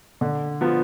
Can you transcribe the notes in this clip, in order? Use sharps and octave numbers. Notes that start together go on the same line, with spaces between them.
D3
F3 B3 F4